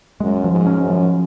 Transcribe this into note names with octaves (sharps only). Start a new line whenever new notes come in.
F#2 G#3
F3
G#2
C#4
F#2
F3